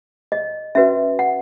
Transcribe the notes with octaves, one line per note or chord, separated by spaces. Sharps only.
D#5
C#4 F#4 B4 E5
F#5